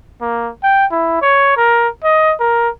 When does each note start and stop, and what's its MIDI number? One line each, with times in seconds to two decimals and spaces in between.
0.21 0.50 58
0.63 0.86 79
0.91 1.18 64
1.22 1.56 73
1.57 1.88 70
2.04 2.34 75
2.40 2.69 70